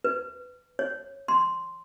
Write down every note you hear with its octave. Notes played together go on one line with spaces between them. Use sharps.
B4
C#5
C6